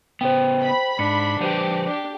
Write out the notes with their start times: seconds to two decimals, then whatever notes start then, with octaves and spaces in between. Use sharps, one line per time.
0.21 C#3 B3 C5 G5
0.62 B5
0.99 G#2 D4 C#7
1.41 F3 G4 B4 C5
1.86 D4 G4